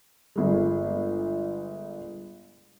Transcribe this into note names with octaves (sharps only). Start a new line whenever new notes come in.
G1 G#3